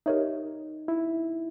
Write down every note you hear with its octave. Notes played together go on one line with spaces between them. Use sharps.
D#4 G4 A#4 C#5 E5
E4